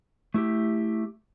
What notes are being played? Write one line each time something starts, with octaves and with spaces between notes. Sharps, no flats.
A3 E4 G4